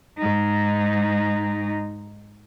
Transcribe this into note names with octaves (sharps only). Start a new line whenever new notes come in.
G#2 D#4